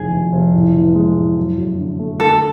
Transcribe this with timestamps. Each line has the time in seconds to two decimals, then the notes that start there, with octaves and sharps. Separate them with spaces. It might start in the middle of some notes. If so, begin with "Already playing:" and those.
Already playing: F1 D#3 E3 G#4
0.11 F1
0.32 F1
0.54 A2
0.75 E3
0.95 G#3
1.16 A2
1.37 F#3
1.57 F#2
1.78 D3
1.99 A3
2.20 D3 A4